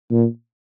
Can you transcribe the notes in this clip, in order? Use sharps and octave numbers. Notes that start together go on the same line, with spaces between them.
A#2